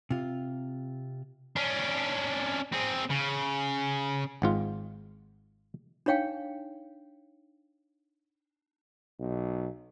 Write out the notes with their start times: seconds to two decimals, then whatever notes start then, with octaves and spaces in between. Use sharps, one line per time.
0.11 C3 F4
1.56 C#4 D4
2.73 C4 G#4
3.10 C#3
4.42 G#1 G#2 F4
6.06 D4 D#4 C#5 F5 G5
9.19 B1